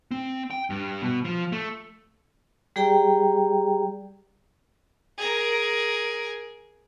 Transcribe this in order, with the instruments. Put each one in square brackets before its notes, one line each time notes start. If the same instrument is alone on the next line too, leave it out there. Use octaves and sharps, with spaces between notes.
[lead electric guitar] C4
G5
G2
B2
F3
A3
[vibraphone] G3 G4 G#4 D5 G5 A#5
[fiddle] G#4 A#4